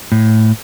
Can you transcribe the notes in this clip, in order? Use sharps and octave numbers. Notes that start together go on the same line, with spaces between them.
A2